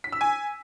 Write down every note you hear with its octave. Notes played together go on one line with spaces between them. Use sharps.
B6
E6
G#5